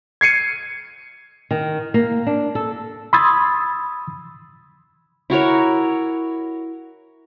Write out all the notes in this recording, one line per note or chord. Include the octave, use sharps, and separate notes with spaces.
G#6 C7 C#7 D#7
D#3
A#3
D4
A4
B5 C6 D#6 E6 G#6 A6
E4 F#4 A#4 C#5